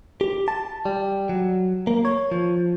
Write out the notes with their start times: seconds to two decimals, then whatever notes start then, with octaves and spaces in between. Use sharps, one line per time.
0.21 G4
0.48 A5
0.85 G3
1.29 F#3
1.87 A#3
2.05 C#5
2.32 F3